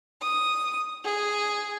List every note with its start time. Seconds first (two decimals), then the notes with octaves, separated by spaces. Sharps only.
0.21 D#6
1.03 G#4